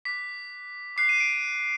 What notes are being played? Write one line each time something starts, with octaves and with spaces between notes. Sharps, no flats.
D6 F#6 B6
D6 F#6 C7
D#7
D7